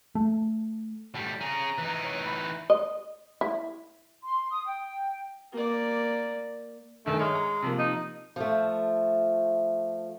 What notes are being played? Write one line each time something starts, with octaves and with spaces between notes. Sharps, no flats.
A3
A2 G3
C#4 G#4 A#5
E3 D#4
C#5
B5
D#5
E4
C6
D#6
G5
A#3 D5
G2 D#3 A3 G#5
G#3 C#5 F6
A#5
C3 F3 A#3
D#4
F3 A3